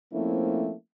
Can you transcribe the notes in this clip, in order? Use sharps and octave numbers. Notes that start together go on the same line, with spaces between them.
F3 A3 A#3 C4 C#4 E4